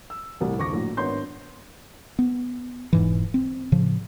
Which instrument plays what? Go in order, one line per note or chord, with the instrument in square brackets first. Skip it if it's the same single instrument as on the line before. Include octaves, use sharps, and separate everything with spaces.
[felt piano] E6
C2 A2 C3 G3
F2 D3 F3 C#6 D6 A#6
A#1 A2 F#3
G#1 B3 D4 C#5 C6 G6
[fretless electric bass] B3
E1 G#2 E3
C4
A2 C#3 F3